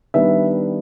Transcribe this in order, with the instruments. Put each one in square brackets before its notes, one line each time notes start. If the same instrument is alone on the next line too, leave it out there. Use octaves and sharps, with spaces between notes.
[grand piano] D#3 G3 B3 D4 [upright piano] E5